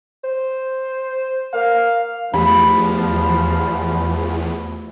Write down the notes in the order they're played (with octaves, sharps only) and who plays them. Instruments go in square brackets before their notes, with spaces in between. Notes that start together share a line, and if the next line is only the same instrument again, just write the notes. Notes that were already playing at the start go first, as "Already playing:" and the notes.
[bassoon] C5
[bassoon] A#3 [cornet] F5
[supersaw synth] E2 [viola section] F3 [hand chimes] A3 G4 [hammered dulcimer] B5